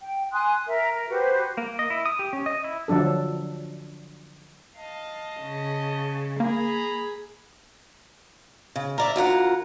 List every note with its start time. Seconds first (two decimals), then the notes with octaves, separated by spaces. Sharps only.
0.01 G5
0.33 G#5 C6 D#6 F#6
0.67 A#4 E5
0.92 A#4
1.09 F#4 G4 B4 C5
1.57 A#3
1.79 D#5
1.90 E4
2.06 D#6
2.19 G4
2.33 C#4
2.46 D#5
2.64 E4
2.88 D3 F3 F#3 D4 A4
4.78 D#5 F5 A5
5.41 C#3
6.40 A#3 G#4 A#5 B5
8.76 C#3
8.98 A#4 D5 E5
9.16 D2 F4 A#4 F#5